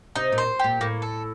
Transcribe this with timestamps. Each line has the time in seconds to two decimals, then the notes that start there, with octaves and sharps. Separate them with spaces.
0.16 C3 D#4
0.32 A#2
0.38 C5
0.59 A#2 G4
0.81 A2 A#3
1.02 A4